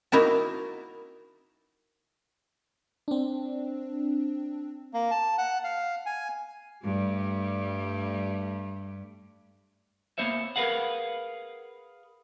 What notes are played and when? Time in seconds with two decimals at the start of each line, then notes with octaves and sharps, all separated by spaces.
0.12 A#3 D#4 E4 F#4 A#4 A5
3.08 C4 D4
4.94 A#3
5.11 A5
5.38 F#5
5.64 F5
6.06 G#5
6.83 G2 G3 A3
10.18 A#3 B3 C5 C#5 E5
10.56 G#4 A#4 B4 F5 F#5